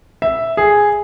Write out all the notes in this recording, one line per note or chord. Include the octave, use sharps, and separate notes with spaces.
E5
G#4